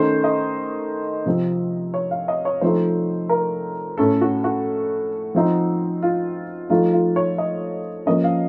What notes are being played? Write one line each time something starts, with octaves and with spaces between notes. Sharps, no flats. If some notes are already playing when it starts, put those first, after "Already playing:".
Already playing: D#3 A3 C#4 C5
D#5
C3 F3 C4
C#5
F5
D#5
C#5
F3 A3 C4 D#4 C5
A#4
A2 A3 C#4 A4
F#4
F#4
F3 C4 D#4
F4
F3 A3 D#4 F4
F4
C#5
D#5
F3 A#3 C#4 D#5
F5